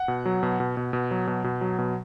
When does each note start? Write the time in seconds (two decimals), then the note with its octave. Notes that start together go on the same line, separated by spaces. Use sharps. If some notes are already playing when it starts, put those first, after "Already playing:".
Already playing: F#5
0.08 B2
0.26 F#3
0.43 B2
0.60 B2
0.77 B2
0.93 B2
1.11 F#3
1.27 B2
1.44 B2
1.61 F#3
1.79 B2